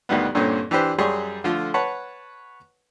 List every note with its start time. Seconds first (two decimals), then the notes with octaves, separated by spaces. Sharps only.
0.09 D2 B2 D#3 G3 B3
0.35 G2 A#2 D3 C4 C#4
0.71 E3 D4 G4 B4 C5
0.99 F#2 G3 G#4 C#5 C6 C#6
1.44 D3 F3 A3 F4
1.74 B4 C#5 F#5 A5